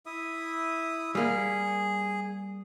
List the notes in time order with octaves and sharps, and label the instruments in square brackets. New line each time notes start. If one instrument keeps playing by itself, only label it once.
[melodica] E4 E5 D#6
[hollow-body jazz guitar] G3 A#3 [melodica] G#4